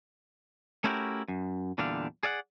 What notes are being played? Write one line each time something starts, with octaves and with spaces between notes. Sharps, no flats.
A3 C#4 E4 F#4 G4 A#4
F#2
E2 A#2 D3 G3 D4 F5
G#4 D5 F5 F#5